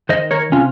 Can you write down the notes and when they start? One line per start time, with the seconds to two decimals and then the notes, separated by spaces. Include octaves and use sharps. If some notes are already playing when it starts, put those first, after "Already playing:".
0.09 D#3 C5 D#5
0.31 A#4 C#5
0.52 C3 C#4 F4